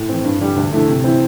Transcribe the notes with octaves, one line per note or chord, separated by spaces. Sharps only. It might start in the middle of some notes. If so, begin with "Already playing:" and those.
Already playing: A2
E3 C4
G2
D3 G3
D2
D3 A3 E4
C3
E3 C4 E4